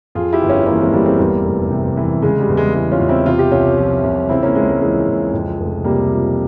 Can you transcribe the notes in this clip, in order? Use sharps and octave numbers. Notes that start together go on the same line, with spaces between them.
F2 F4 G#4
E4 G4
G1
C#4 F4
E3 A#3 C#4
G#3 C4
G1 G3 A#3
G#3 C4
E2 G3 A#3
F1
C3
E3
C#3 G#3
G3
E2
G#3
E3 G#3
C#4 F4
E2
C4 E4
C3 F4
G4
C2 C#4 F4
F3
C2
C#3 C4 E4
A#3 C#4
C#2 G#3
G#3
E3 G#3
C#2
F2
F1
C3 G3 A#3
F3